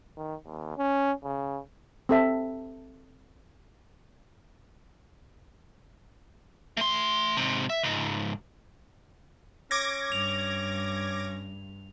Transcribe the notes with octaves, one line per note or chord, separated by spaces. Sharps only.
D#3
D#2
C#4
C#3
C4 A4 E5
A3 C6
G#2 C3
E5
C#2 G#2
C#4 D6 G#6 A#6
G2 F7